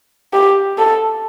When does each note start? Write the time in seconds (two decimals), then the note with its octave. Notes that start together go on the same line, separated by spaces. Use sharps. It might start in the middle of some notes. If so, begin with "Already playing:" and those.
0.34 G4
0.78 A4